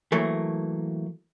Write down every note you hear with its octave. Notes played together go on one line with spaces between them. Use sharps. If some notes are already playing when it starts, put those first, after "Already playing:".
E3 F#3 A3 A#3